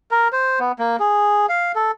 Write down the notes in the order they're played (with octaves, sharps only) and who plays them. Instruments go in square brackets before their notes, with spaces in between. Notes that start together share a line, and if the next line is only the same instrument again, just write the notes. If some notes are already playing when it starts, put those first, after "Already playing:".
[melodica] A#4
C5
B3
A#3
G#4
F5
A4